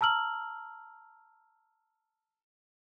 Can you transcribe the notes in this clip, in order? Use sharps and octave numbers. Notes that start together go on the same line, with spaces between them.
A5 A#5 E6 F6 F#7